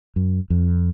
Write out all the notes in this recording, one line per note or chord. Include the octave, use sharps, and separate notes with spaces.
F#2
F2